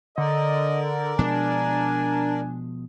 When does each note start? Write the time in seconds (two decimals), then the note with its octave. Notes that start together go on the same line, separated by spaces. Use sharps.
0.18 D3 A#4 D5 D#5
1.19 B2 F3 G#3 D4 G#5